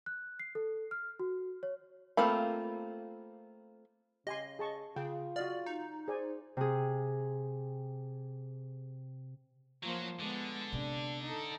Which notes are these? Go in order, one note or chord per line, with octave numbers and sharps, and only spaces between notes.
F#6
C7
A4
F6
F#4
C#5
A3 A#3 C4 F4 B5
C#3 G4 D#5 G#5 C6
G#4 A5 C#6
C#3 F4 G#4 G5
F#4 D5 D#5 F5
D#4
G#4 C5 D5 G#5
C3 G#4
F3 F#3 A#3 C5
D3 G#3 B3
C3 B3 D4
D#4 A4